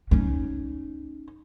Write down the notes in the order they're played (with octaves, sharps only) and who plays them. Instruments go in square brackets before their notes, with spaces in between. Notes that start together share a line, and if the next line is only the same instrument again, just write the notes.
[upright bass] C#4 D#4